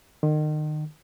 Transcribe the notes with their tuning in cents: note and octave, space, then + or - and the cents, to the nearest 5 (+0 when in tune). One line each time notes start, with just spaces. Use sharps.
D#3 -35